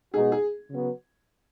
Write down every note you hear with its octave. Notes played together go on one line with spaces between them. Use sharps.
B2 G#3 D#4 F#4 G#4
G#4
C#3 F#3 B3